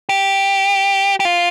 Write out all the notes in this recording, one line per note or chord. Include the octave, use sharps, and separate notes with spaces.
G4
G4
F4